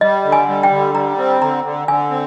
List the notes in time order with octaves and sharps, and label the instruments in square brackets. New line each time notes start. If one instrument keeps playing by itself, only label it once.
[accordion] G3 [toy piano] D#5
[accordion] D3
[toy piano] G#5
[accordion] G3
[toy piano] G5
[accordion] D3
[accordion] G3 [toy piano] A#5
[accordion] C4
[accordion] D3 [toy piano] A#5
[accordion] D3
[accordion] D3 [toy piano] G#5
[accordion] C4